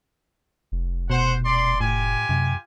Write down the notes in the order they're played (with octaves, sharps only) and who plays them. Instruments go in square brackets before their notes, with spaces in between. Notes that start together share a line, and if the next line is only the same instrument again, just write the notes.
[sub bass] F1
[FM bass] B2 [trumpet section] C5 F#5
[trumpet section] D5 C6
[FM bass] A2 [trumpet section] F4 G4 G#5
[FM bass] F#2 [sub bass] C3